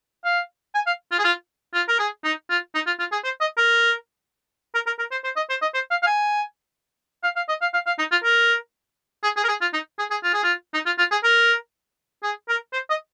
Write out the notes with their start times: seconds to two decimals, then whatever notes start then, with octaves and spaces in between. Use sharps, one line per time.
0.25 F5
0.75 G#5
0.87 F5
1.12 F4
1.19 G#4
1.24 F4
1.74 F4
1.88 A#4
1.99 G#4
2.24 D#4
2.50 F4
2.75 D#4
2.87 F4
2.99 F4
3.12 G#4
3.24 C5
3.41 D#5
3.57 A#4
4.74 A#4
4.86 A#4
4.99 A#4
5.11 C5
5.24 C5
5.36 D#5
5.50 C5
5.62 D#5
5.74 C5
5.91 F5
6.02 F5
6.07 G#5
7.24 F5
7.36 F5
7.49 D#5
7.62 F5
7.74 F5
7.87 F5
7.99 D#4
8.11 F4
8.24 A#4
9.24 G#4
9.37 G#4
9.44 A#4
9.49 G#4
9.61 F4
9.73 D#4
9.99 G#4
10.11 G#4
10.23 F4
10.34 G#4
10.44 F4
10.74 D#4
10.86 F4
10.98 F4
11.11 G#4
11.24 A#4
12.23 G#4
12.49 A#4
12.73 C5
12.90 D#5